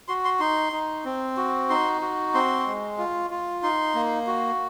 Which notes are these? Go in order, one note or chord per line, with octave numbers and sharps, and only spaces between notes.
F#4 C6
C6
D#4 C6
D#4
C4
F#4
D#4 C6
F#4
C4 C6
G#3
F4
F4
D#4 C6
A#3
F#4